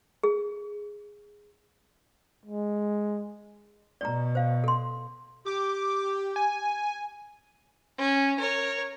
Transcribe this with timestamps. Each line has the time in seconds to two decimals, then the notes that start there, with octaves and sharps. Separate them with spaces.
0.23 G#4
2.46 G#3
4.01 B2 D5 A#5
4.35 C5 F5
4.64 A4 C6
5.46 G4 D6
6.36 G#5
7.98 C#4
8.39 A#4 C#5